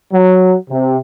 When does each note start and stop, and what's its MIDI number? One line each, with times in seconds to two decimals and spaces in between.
0.12 0.56 54
0.70 0.97 48